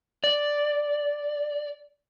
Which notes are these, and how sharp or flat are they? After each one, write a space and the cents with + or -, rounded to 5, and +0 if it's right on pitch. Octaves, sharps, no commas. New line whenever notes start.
D5 +0